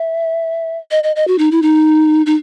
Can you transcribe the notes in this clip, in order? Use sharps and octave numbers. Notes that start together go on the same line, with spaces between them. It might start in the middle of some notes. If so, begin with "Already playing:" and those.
Already playing: E5
D#5
D#5
D#5
F#4
D#4
E4
D#4
D#4